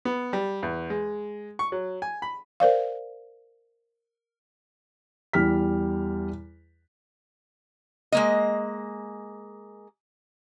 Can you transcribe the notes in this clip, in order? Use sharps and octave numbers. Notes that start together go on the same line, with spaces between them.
B3
G3
E2
G#3
C#6
F#3
G#5
B5
A#4 C5 D5 F5
E2 G3 F6 B6
G#3 A#3 D#5